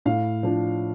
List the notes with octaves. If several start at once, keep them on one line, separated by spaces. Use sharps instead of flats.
A2 F5
F3 D4